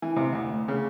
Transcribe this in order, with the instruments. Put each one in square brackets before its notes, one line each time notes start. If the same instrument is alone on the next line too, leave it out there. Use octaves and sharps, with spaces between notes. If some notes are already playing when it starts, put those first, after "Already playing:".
[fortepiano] E3
C3
D2
C#3